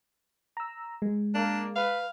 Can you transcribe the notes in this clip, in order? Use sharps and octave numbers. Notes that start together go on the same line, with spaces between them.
A#5 E6
G#3
A#3 D4
B4 F5